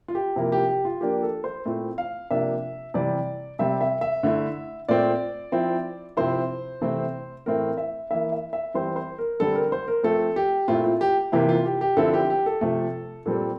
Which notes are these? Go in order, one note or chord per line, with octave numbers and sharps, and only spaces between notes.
F4
G4
C3 F3 A#3 E4
G4
G4
F4
F3 A#3 D4 G4
A4
C5
A#2 A3 C4 E4
F5
C3 F3 A#3 D4 E5
C3 E3 G3 D5
C3 G3 C4 E5
E5
E5
D3 A3 E4
A#2 A3 C4 D5
F3 C4 E4
C3 F3 C4 E4 C5
C3 E3 A3 C4 E4
A2 E3 A3 C4 E4 A#4
E5
E3 A#3 E4 E5
E5
E5
E3 G3 C4 E4 C5
C5
A#4
D3 G3 C4 A4
A#4
C5
A#4
F3 A3 C4 A4
G4
A#2 A3 C4 E4 F4
F4
G4
C3 E3 A#3 E4 G4
F4
G4
G4
D3 F3 C4 E4 A4
G4
G4
A4
C3 F3 A3
A#2 G3 C4 A4